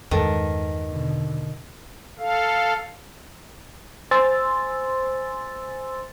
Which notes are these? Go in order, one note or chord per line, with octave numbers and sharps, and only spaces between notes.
E2 G2 D#3 G#3 A4 B4
B2 D3
A4 F5
C5 G#5 C6 E6 A6